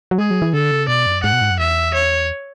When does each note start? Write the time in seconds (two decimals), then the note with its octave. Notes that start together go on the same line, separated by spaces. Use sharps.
0.11 F#3
0.18 G#3 G#4
0.31 F#3
0.42 E3
0.53 D3 A4
0.71 C#3
0.88 B2 D5
1.06 F#2
1.23 G#2 F#5
1.33 B2
1.41 G#2
1.51 F#2
1.58 E2 E5
1.94 C#5